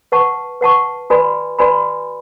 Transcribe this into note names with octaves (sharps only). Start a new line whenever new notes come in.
B4 F#5 A5 C#6
B4 F#5 A5 C#6
F#4 B4 D5 G#5 B5
F#4 B4 D5 G#5 B5